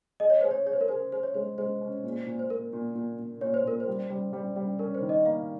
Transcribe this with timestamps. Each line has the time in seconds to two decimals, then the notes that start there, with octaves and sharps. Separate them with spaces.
0.20 G#4 D#5
0.30 C#5
0.41 G#4 C5
0.51 C#5
0.66 G#4 C#5
0.73 C5
0.81 A#4
0.88 G#4 C5
1.12 G#4 C5
1.23 C#5
1.34 G#3 C5
1.58 G#3 C5
1.81 C#4
2.04 A#2
2.26 A#2
2.39 C5
2.50 A#2 A#4
2.73 A#2
2.95 A#2
3.19 A#2
3.41 A#2 C#5
3.54 C5
3.64 A#2 A#4
3.80 C5
3.87 G3
4.10 G3
4.33 G3
4.56 G3
4.79 C#4 A#4
4.95 C5
5.02 D#3
5.09 D#5
5.25 A#3 F5